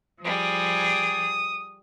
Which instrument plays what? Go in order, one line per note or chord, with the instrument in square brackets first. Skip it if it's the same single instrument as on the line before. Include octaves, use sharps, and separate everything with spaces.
[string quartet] F3 G3 G#4 [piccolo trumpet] D#6